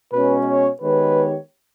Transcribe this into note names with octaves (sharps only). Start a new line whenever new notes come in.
B2 G#3 C#4 B4
C#5
D#3 G#3 B3 G4 B4 C#5